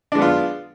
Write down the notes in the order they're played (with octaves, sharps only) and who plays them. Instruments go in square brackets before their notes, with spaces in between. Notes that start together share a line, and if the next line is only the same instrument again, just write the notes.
[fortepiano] D4
G#3
B3
F4